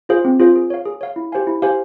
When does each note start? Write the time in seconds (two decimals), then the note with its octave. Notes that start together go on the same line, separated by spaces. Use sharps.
0.09 F4 G#4 C5 F5
0.25 C4
0.40 F4 G#4 C5 F5
0.56 G#4
0.70 C#5 F5
0.85 G#4
1.01 C#5 F5
1.16 E4
1.32 G4 C5 F5 G#5
1.47 E4
1.62 G4 C5 F5 G#5